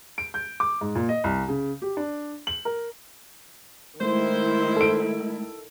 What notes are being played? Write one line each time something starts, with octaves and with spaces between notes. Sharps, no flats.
D7
G6
D6
G#2
A#2
D#5
C2
C#3
G4
D4
F#7
A#4
D#3 G#3 A3 E4 C5
A4 D7